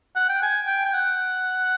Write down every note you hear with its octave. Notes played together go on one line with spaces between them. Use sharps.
F#5
G5
G#5
G5
G5
F#5